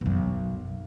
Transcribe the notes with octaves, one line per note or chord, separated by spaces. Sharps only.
B1 F#2